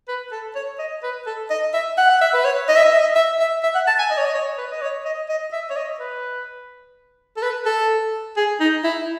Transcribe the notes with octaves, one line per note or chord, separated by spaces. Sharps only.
B4
A4
C#5
D#5
B4
A4
D#5
E5
F#5
F#5
E5
B4
C#5
D#5
E5
D#5
E5
D#5
E5
E5
E5
F#5
A5
G#5
D#5
C#5
D#5
C#5
B4
D#5
C#5
D#5
D#5
E5
C#5
D#5
B4
A4
B4
A4
G#4
D#4
E4